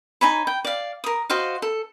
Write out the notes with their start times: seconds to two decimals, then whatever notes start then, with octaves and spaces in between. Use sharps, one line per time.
0.21 D#4 C#5 G#5 B5
0.47 G5
0.65 D5 F5
1.04 A#4 D#6
1.30 F#4 C5 D#5 F5
1.62 A4